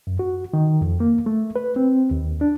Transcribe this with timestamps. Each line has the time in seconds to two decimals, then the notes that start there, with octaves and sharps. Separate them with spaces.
0.07 F#2
0.19 F#4
0.54 D#3
0.81 F2
1.00 A#3
1.26 A3
1.56 B4
1.76 C4
2.11 D#2
2.41 D4